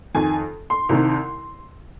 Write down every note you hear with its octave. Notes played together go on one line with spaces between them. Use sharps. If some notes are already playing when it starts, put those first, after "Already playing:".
F2 D#3 G#5
C6
C2 C3 D#3